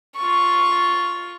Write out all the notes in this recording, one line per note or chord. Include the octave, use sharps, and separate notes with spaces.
F4 C#6